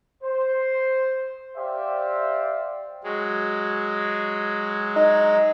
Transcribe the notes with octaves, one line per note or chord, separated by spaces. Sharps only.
C5
G4 C5 D5 E5 F5
F#3 G#3
D#4